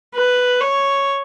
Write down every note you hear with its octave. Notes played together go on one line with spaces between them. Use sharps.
B4
C#5